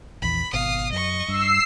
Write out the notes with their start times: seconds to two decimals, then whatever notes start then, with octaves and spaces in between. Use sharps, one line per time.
0.22 A#1 E2 B5
0.53 G#1 B2 F5 D#6
0.92 F#2 D#5 C#6
1.28 G2 E6 C7